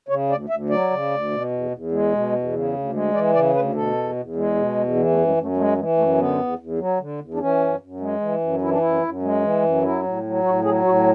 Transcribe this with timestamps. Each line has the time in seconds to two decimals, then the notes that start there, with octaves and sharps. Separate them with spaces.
0.08 C#3 C#5
0.29 D2 D5
0.49 D2 E5
0.69 F#3 D5
0.90 C#3
1.11 D2
1.30 B2
1.51 E2
1.71 E2
1.92 G#3
2.12 B2
2.32 E2
2.53 C#3
2.73 D2
2.93 G#3
3.13 E3 D5
3.33 C#3 D5
3.54 D2 B4
3.74 B2 A4
3.95 E2
4.15 E2
4.35 G#3
4.55 B2
4.76 E2
4.95 E3 B3
5.11 A3
5.17 F#2
5.27 G#3
5.37 F#2
5.42 A3
5.56 G#3 A3
5.77 E3 G#3
5.97 F#2 A3
6.18 D3 B3
6.38 E2
6.59 E2
6.78 F#3
6.99 D3
7.20 E2
7.34 D4
7.39 E3 C#4
7.60 F#2
7.80 F#2
8.00 G#3
8.21 E3
8.40 F#2
8.61 E3 E4
8.70 D4
8.79 F#2 E4
9.02 F#2
9.22 G#3
9.42 E3
9.63 F#2
9.83 F#3 E4
10.03 A2
10.23 F#3
10.44 A2 F#4
10.64 F#3 G#4
10.84 A2 F#4